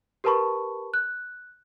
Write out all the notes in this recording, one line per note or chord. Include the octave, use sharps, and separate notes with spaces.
G4 A#4 B4 A5 B5 C#6
F#6